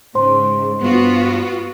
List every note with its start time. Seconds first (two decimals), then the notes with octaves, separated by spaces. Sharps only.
0.15 G#2 C#3 C5 C6
0.81 G2 B3 F4 F#4